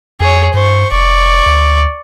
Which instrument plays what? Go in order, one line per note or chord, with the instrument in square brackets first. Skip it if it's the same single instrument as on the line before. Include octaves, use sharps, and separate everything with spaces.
[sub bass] F2 [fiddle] G#4 C#5
[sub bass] G2 [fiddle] C5 C#6
[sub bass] F1 [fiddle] D5 C#6
[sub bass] D2